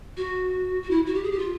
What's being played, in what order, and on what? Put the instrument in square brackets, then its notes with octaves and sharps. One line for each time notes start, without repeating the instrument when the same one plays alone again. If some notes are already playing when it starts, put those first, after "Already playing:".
[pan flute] F#4
F#4
E4
F#4
G4
G#4
G4
F4